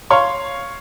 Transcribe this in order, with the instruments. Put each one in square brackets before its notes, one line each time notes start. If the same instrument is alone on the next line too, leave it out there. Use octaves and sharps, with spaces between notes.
[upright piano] C#5 F5 C6 C#6